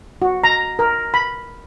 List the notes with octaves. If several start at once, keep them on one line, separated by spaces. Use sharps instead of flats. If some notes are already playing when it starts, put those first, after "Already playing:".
F#4
A#5
A#4
B5